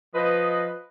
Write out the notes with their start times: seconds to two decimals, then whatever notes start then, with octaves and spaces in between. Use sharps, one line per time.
0.15 F3 B4 D#5